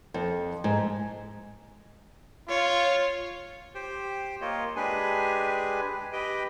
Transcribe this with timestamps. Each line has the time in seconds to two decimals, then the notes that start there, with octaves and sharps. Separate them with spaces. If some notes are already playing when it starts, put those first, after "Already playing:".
0.14 F2
0.64 G#2
2.49 F4 C#5
3.75 G4 C5 G5
4.41 A#3 F4 C#5 D#5
4.76 G#3 D4 G4 G#4 B4 G#5
5.99 G4
6.12 G4 B4 D#5 G5